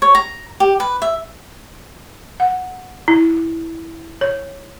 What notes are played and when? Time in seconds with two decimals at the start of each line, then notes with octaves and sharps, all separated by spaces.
0.02 C#5
0.15 A#5
0.60 G4
0.80 B4
1.02 E5
2.40 F#5
3.08 E4
4.21 C#5